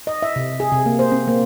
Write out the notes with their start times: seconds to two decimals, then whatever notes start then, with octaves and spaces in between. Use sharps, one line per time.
0.07 D#5
0.22 E5
0.36 C3
0.60 G#4
0.72 C3
0.86 A#3
0.99 C5
1.12 C4
1.28 A#3